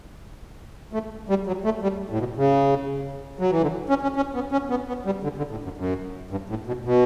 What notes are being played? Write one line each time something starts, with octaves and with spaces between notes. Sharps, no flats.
A3
G3
F#3
A3
G3
A2
B2
C#3
F#3
E3
D3
C#4
C#4
C#4
B3
C#4
B3
B3
G3
D3
D3
A2
F#2
F#2
G2
A2
B2
B2